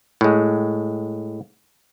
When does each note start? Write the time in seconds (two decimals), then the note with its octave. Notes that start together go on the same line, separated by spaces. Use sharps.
0.21 A2 G#3